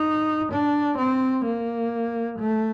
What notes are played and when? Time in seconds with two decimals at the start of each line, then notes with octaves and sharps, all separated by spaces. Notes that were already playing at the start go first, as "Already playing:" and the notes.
Already playing: D#4
0.52 D4
0.98 C4
1.45 A#3
2.38 A3